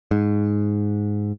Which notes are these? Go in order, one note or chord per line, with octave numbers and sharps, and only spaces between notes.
G#2